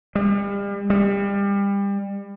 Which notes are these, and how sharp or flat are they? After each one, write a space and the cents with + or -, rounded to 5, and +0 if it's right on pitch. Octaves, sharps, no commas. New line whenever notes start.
G3 +40
G3 +30